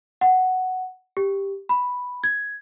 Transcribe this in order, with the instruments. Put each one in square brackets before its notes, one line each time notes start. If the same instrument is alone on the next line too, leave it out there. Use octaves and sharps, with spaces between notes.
[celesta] F#5
G4
B5
G#6